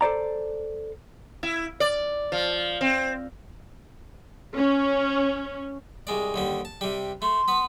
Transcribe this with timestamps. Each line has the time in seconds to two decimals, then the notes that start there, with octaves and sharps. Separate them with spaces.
0.01 A4 C5 D5 A#5
1.43 E4
1.80 D5
2.32 F3
2.81 C4
4.56 C#4
6.07 C2 G#3 D5
6.34 D#2 D3 G3
6.65 A5
6.81 C3 G3
7.22 A3 C6
7.48 B3 B4